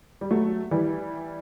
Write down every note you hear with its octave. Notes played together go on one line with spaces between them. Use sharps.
G3
F#3 A3
E3 G3